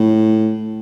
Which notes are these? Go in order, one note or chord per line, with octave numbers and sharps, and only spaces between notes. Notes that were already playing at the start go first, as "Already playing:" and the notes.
Already playing: A2